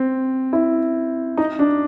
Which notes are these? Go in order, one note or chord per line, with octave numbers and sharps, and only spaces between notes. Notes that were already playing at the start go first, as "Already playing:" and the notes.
Already playing: C4
E4
D#4
D4